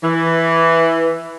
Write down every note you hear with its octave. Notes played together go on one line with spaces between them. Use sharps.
E3